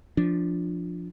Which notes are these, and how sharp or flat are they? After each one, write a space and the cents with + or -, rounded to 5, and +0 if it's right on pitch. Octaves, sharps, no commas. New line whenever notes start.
F3 +0 D4 +0